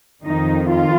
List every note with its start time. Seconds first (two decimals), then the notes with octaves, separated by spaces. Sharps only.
0.24 F2 D#3 D#4
0.68 F4